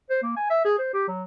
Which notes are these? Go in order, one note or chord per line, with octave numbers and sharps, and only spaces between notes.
C5
A#3
G#5
E5
G#4
C5
G4
F#3